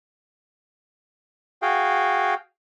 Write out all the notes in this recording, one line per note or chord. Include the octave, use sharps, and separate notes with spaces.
F#4 G#4 F5 G5